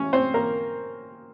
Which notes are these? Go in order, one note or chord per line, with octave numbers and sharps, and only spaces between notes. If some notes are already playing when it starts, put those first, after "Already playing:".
Already playing: C#4 C#5
C4 C5
A#3 A#4